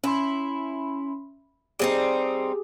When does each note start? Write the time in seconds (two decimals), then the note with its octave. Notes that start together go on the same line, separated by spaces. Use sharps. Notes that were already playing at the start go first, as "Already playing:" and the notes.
0.04 C#4 E4 B5 C6
1.79 G3 C4 D#4 G4 G#4